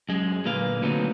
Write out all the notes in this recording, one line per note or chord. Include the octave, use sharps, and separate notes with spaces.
F#2 G#3
A#2 D3 A#3 B4 F5
D3 F#3 A3 B3 C4 D#4